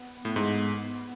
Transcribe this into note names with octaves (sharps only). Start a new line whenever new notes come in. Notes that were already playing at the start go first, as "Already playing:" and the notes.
Already playing: B3
A2
G#2